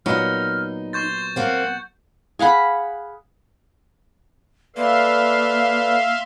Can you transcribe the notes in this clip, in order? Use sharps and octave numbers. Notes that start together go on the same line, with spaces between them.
A#2 F#3 B3 D#4 F6
C6 C#6 G6 A6
A#3 C4 F#5
G#4 F5 F#5 B5
A#3 A4 B4 D5 E5 F5 C6